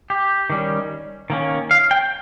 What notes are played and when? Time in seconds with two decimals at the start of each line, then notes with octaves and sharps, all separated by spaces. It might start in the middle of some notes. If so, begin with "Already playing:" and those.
0.10 G4
0.50 D#3 G3 C#4
1.30 D#3 A#3 C#4
1.71 F5
1.91 G5